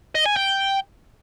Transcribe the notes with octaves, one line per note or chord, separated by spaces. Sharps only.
D#5
G#5
G5